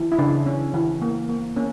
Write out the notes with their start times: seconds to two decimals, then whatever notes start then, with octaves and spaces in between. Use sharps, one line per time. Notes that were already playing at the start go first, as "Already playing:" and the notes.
Already playing: E3
0.12 E4
0.19 C#3 D4
0.46 C#4
0.74 E3
1.02 A#3
1.29 A#3
1.56 A#3 C#4